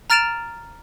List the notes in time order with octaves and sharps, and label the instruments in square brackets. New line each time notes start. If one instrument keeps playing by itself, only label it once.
[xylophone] A#5 F6 A6 D7 E7 F7